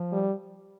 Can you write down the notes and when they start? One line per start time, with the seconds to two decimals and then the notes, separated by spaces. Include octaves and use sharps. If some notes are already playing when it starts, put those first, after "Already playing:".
Already playing: F3
0.12 G3